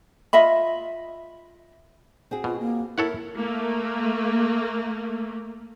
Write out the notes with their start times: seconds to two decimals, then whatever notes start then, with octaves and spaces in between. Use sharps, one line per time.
0.33 F4 D#5 E5 B5
2.31 C4 F#4 G#4
2.44 B2 F4
2.59 A#3
2.98 E4 A4 A#4 C#5 F#5
3.37 A3 A#3